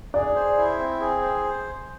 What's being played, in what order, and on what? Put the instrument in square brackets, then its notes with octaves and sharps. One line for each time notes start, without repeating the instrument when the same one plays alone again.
[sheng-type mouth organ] G#4 [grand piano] D5
[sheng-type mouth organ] C5
E4
C4
G#4
C5